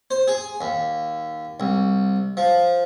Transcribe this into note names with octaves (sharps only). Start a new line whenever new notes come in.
C5
G#4
D#2
C2
F3